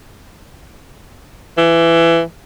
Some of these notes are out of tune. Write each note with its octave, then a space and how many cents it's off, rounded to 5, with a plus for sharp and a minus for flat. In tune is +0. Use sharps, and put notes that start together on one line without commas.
E3 +20